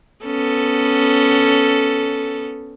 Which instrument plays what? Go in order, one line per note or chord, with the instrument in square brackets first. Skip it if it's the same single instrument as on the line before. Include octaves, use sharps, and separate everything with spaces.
[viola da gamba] B3 C#4 A4